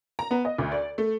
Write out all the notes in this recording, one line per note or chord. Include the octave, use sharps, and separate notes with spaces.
A#5
B3
D#5
D2
D5
A3